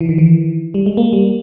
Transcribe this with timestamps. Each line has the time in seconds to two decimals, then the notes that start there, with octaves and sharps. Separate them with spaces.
0.01 E3
0.09 D#3
0.18 E3
0.74 G3
0.86 G#3
0.97 A#3
1.13 G3